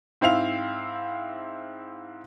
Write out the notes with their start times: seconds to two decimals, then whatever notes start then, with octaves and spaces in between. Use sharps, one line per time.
0.21 G#2 C4 E4 F5 F7